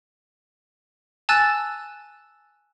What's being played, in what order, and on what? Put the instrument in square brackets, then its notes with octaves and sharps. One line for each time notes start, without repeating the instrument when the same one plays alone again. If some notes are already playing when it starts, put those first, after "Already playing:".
[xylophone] G#5 A5 E6 F#6 A6